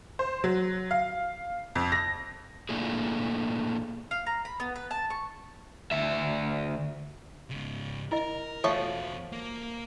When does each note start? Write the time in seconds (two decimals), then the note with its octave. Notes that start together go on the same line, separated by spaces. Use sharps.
0.19 C5
0.44 F#3
0.91 F5
1.75 F2
1.92 A#6
2.69 A#2 A3 A#3 D4 E4 G#4
4.11 F5
4.26 A#5
4.45 B5
4.60 B3
4.76 B4
4.91 A5
5.10 C#6
5.92 D2 E5
7.50 G#2 C#3
8.12 E4 A#4 D#5
8.64 E2 F3 A3 F#4 A4 C#5
9.32 A#3